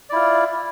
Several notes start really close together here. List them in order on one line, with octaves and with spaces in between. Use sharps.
D5 E4 F4